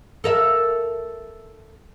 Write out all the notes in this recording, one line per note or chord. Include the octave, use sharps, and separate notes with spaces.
A4 A#4 E5